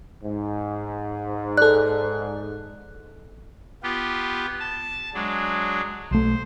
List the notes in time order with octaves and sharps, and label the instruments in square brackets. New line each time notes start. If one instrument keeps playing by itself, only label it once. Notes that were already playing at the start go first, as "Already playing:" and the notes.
[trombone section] G#2
[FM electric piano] A4 D5 [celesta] F#6
[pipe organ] B3 F4 G4
A5
F#3 G#3 D4
[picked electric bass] B1 A3 [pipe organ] C5